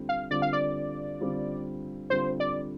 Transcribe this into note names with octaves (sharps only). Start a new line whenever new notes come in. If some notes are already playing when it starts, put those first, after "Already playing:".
Already playing: D3 G3 C4 F4
F5
D3 G3 C4 F4 D5
F5
D5
D3 G3 C4 F4
D3 G3 C4 F4 C5
D5